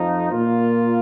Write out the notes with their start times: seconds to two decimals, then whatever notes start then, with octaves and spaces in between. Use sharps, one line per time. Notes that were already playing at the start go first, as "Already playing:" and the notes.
Already playing: F2 F3 D#4
0.31 A#2 A#3 F4